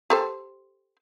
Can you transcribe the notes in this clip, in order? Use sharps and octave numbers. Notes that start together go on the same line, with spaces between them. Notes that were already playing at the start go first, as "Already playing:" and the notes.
G4 A4 C5